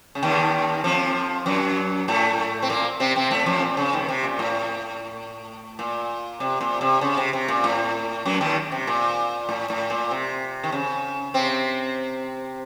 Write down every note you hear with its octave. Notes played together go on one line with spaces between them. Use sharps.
C#3
D#2 D#3
F2 F3
F#2 F#3
A2 A3
C4
A#2 A#3
C3 C4
C3 C4
A2 A3
F2 F3
A#2
C#3
D#2 D#3
C3
A#2
A2
A#2
C3
A#2
C3
C#3
C3
C3
A#2
A2
F#2 F#3
D#2 D#3
C3
A#2
A2
A2
A#2
C3
D#3
C#3
C3 C4